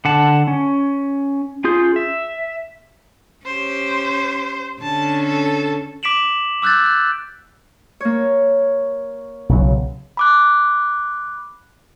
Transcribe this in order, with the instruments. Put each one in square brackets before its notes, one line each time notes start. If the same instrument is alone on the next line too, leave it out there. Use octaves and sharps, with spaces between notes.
[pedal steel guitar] D3 F#5 A5
C#4
C#4 F4 G#4 G6
E5
[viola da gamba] C#4 G4 [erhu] C5
[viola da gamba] D3 C#4 [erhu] A5
[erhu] A4
[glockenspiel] D6 B6 D7 E7 F#7
D6 E6 F#6 G6 A6
F#6
[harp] A#3 C#5
[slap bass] B1 C#3 F#3
[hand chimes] B5 D6 F#6